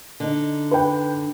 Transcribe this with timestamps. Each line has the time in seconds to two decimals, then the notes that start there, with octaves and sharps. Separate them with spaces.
0.20 D3 D#4
0.71 B4 G5